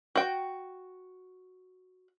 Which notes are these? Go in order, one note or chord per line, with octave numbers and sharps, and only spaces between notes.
F#4 G5